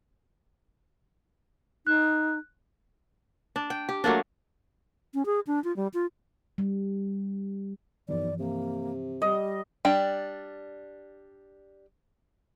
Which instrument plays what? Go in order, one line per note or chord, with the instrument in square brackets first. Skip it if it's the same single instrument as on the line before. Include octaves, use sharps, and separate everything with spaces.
[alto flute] D#4 [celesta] F#6
[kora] D4
G5
G4
F#3 A3 A#3 D4
[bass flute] C#4
G#4
D4
F4
G3
F4
[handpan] G3
[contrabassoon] B1 [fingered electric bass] G2 E3 F3 [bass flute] D5
[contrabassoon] C3 [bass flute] A#3
[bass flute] G3 [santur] D#5
[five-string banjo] G3 D4 G5